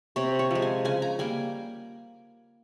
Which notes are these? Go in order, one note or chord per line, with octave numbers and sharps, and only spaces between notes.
C3 C#5
C#5
F3 G#3
G#5
C#3 G#5
A#5
G3 A#3 G#5